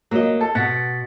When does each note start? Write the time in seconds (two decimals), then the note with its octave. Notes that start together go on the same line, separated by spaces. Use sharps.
0.11 F#3 A#3 D#5
0.41 A4
0.55 B2 B3 F#5 A6 B6